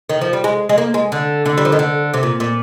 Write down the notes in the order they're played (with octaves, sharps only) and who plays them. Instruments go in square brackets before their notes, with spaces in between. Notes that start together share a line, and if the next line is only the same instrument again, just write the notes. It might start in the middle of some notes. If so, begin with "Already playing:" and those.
[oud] D#3
F3
G3
G#3
G#3
A#3
G#3
D3
D3
G3
F3
D#3
D3
C3
A#2
A#2